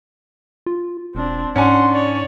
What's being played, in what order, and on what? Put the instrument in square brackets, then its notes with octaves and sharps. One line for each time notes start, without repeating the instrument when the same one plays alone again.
[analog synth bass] F4
[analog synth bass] E1 [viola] C4 D4
[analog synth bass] G#2 [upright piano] C#4 D4 G#5 [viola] F#5 C6
[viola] C#5 D5